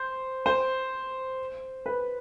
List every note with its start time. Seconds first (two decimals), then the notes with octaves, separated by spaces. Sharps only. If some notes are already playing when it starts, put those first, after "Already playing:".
Already playing: C5
0.46 C5
1.86 B4